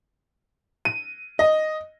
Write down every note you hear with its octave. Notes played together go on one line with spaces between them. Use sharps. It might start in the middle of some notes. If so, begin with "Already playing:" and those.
D#7
D#5